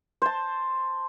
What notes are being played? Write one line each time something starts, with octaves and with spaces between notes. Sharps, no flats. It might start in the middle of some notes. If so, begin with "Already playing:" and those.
C5 A5